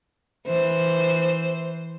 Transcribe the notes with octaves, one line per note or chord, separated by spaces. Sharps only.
E3 C5